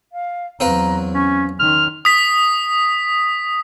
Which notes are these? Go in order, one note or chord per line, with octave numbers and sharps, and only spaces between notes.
F5
E2 F#3 C4 B4 F5 A#5
C#4 C#6
D#3 C#4 C6 F6
D#6 B6